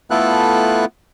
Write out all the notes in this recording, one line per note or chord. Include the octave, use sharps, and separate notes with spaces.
A3 B3 E4 F4 A4 F#6